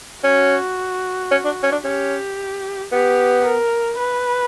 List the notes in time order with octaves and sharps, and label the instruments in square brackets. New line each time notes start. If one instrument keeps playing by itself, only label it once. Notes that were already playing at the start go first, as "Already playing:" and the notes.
[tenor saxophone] C#4 [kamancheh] F#4
[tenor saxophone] C#4
D4
C#4
D4
[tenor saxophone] C#4 [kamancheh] G4
[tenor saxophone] B3 [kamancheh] G4
[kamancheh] A#4
B4